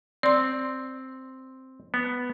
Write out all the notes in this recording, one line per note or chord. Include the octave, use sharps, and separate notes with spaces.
C4 D5 C6
B3